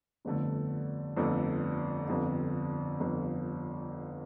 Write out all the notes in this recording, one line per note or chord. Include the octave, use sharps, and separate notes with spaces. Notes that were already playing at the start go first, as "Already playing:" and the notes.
G1 F2 D3 A3
G1 F2 D3 A3
G1 F2 D3
G1 F2 D3